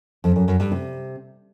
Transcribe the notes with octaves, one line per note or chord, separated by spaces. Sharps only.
F2
F#2
F#2
G2
C3